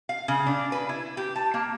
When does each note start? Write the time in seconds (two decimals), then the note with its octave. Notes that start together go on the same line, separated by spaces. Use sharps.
0.09 F5
0.28 C#3
0.47 D4
0.72 B4
0.89 E4
1.17 G4
1.36 A5
1.54 A#3